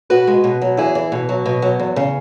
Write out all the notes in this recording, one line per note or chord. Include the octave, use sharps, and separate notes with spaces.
B2 F#4 B4
G#3
B2
F#3
E2 E4 G#4
E3
B2
F#3
B2
F#3
E2
C#3